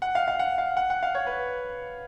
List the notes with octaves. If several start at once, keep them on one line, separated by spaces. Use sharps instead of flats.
F#5
F5
F5
F#5
F5
F#5
F#5
F5
C#5
B4